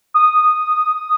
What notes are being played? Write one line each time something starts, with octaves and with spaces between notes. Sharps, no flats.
D#6